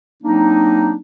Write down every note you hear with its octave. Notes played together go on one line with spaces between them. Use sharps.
F#3 A#3 C4 D4 D#4